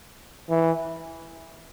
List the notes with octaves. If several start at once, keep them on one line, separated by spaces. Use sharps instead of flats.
E3